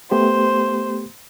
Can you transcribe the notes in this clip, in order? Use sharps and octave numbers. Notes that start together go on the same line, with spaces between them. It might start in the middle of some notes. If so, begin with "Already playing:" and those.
A3 B3 G4 C5